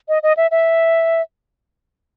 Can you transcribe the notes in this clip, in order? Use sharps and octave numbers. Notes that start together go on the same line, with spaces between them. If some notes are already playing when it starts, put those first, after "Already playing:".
D#5
D#5
E5
E5